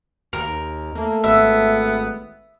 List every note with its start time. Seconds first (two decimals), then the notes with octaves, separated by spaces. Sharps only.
0.33 D#2 A#4
0.95 A3 A#3
1.24 G#1 B3 E5